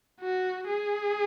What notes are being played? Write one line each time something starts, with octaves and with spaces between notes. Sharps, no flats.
F#4
G#4